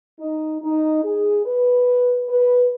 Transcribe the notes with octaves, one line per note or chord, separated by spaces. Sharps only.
D#4
D#4
G#4
B4
B4